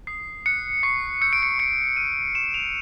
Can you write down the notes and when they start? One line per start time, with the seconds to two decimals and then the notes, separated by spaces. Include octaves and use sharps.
0.07 D#6 C7
0.46 F#6 C#7
0.83 C#6 C7
1.21 E6 G6 C#7
1.33 D7
1.43 C#7
1.59 C#6 C#7
1.97 F6 D#7
2.35 C#6 E7
2.54 F7